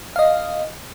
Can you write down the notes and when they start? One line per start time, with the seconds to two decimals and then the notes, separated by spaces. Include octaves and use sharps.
0.16 D#5 F5